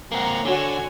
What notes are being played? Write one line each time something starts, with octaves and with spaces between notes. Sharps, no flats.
A#3 C4 F#5 A#5
D3 F#4 C#5 G#5